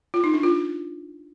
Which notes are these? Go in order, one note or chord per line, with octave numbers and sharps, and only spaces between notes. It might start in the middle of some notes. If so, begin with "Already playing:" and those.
F4
D#4
D4
F4